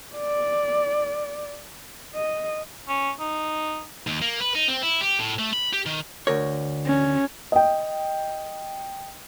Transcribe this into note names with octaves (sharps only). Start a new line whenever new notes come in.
D5
D#5
C#4
D#4
D#2
A#3
B4
D#4
C4
E4
G4
A2
A3
B5
G4
D#3
D2 A#4 C#5
C#4
D#5 G5